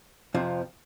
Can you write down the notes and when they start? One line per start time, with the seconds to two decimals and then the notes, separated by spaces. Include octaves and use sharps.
0.34 F2 C3 F3